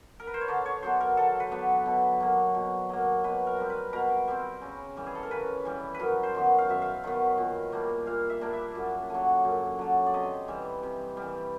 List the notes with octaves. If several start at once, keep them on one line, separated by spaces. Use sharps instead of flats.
A#4
B4
C5
C#5
D3 D5
C#5
F#3 B3 D4 C5
A#4
D3 A4
B4
F#3 B3 D4
B2
F#3 A#3
B2
F#3 A#3
B2 B4
A#4
G3 C4
B4
B2 A#4
G3 C4
C#3
E3 G3
G#4
A4
A#4
C#3 B4
E3 G3
B4
F#2 A#4
C5
D#3 F#3 B3
F5
F#2 E5
F5
D#3 F#3 B3
A#2
G3 A#3 D4
A#2 F5
E5
G3 A#3 D4
E5
F#2
D3 F#3
F#2
D3 F#3
D5
C3 D#5
E3 G3
C3
E3 G3